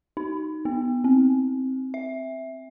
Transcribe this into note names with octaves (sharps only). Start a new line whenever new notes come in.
D#4
B3
C4
E5